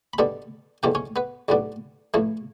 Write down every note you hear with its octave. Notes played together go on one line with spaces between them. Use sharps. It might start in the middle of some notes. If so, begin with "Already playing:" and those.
B5
B2 G3 B3 D4 A4 A5
E2 B2 A3 C#4 G4 G5
C#4 C#5
B3 B4
B1 A2 G3 B3 D4
A1 A2 E3 A3 E4